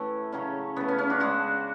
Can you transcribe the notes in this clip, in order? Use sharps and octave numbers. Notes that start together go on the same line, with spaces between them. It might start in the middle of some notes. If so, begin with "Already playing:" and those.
Already playing: A2 E3 A3 C#4
C#3 F#3 A3 C#4
C#3 E3 A3 B3
C#4
C#4
D4 F#4
C#3 G#3 D4 F#4